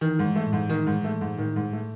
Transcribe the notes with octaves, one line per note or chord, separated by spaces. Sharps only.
D#3 E3
G#2 G#3
A3
A2
G#2
D#3
G#2
A3
G#2
A2 D#3
G#2
A3